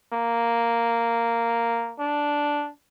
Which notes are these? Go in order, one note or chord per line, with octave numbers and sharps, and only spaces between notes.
A#3
D4